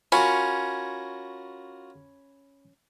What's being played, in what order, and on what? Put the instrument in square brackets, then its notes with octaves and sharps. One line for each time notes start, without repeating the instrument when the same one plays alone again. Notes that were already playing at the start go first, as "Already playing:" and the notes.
[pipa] C#4 [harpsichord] F4 F#4 A#4 [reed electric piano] B5